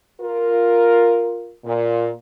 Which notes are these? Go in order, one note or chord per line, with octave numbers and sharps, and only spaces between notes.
F4 A#4
A#2